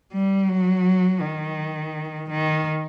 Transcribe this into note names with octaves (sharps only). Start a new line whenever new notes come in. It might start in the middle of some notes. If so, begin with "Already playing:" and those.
G3
F#3
D#3
D#3